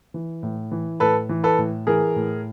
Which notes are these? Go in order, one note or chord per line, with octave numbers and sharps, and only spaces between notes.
E3
A2
E3
A2 A4 B4
E3
A4 B4
A2
E3 G#4 A#4
A2